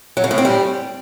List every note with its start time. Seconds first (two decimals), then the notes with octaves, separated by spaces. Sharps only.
0.17 F#3
0.24 C#3
0.31 A2
0.38 C4
0.45 G3